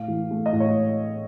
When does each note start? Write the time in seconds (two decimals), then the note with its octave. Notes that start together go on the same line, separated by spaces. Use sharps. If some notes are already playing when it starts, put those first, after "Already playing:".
Already playing: A2 F5
0.08 E3
0.31 A3
0.46 D#5
0.53 A2
0.60 C#5